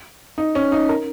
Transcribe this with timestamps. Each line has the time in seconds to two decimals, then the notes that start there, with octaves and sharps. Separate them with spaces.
0.38 D#4
0.55 C#4
0.72 D#4
0.89 A#4